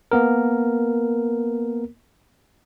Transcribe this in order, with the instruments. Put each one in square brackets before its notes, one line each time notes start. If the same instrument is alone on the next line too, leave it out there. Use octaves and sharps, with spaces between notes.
[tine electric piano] A#3 B3 A#4